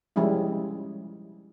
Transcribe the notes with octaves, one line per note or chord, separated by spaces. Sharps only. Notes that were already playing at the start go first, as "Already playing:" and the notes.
F3 G3 G#3 C#4 E4